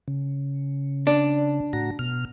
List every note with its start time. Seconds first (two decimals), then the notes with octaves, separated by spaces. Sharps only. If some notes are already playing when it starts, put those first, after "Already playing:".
0.08 C#3
1.07 D4
1.73 A2 F#4 A#5
1.99 B2 F6